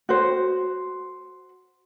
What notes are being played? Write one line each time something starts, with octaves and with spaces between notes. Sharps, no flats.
F#4 C5